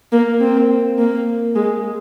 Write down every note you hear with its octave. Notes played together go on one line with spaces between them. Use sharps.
A#3
C4
A#3
G#3